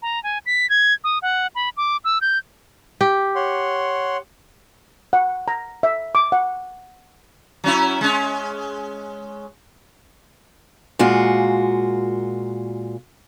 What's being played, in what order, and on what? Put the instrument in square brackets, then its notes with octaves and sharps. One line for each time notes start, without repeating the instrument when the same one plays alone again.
[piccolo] A#5
G#5
B6
G#6
D#6
F#5
B5
D6
E6
G6
[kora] G4
[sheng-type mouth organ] C#5 F#5 C6
[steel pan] F#5
A#5
E5
D6
F#5
[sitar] F#3 C#4 E4
G#3 C#4
[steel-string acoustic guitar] A#2 G#3 F4 F#4